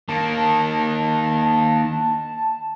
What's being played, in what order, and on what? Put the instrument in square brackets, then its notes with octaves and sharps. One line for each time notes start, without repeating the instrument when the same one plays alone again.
[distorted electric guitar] D#3 A#3 [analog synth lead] A5